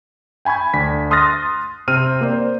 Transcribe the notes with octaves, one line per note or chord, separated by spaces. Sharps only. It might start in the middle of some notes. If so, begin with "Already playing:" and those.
G5 G#5 B5 C#6 G#6
D2 D4 B6
C6 D#6 F6 F#6 A6 A#6
C3 C4 F6 D#7
A#3 C5 D5